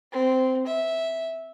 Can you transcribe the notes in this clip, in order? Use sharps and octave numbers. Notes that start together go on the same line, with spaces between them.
C4
E5